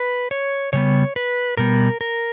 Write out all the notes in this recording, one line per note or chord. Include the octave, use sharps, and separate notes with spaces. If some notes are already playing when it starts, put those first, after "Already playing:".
Already playing: B4
C#5
C#3 G3 B3 C#5
B4
B2 G3 B3 A#4
A#4